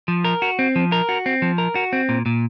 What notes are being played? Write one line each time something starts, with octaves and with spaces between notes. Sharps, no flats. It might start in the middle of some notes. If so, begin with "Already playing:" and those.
F3
A#4
F#4
C4
F3
A#4
F#4
C4
F3
A#4
F#4
C4
A#2
A#2